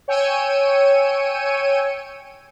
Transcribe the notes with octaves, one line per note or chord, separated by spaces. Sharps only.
C#5 G5 G#5 E6 C#7 D#7